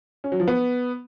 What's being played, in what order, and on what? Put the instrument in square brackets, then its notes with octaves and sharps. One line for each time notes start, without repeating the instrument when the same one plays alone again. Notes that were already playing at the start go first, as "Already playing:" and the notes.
[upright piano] C#4
F#3
F3
B3